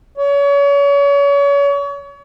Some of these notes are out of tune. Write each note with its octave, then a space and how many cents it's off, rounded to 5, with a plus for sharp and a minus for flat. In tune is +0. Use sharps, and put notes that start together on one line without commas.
C#5 +35